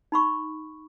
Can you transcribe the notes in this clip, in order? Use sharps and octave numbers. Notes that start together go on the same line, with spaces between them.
D#4 B5 C#6